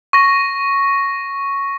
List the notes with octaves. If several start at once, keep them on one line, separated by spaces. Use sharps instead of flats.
C#6 A#6